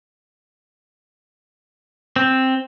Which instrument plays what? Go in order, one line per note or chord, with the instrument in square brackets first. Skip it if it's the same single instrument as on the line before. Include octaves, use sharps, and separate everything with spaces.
[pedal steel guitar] C4